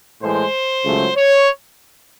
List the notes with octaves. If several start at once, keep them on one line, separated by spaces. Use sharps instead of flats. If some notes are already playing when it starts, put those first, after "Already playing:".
A2 E3 G#3 C5
C#2 C#3 F#3 A3
C#5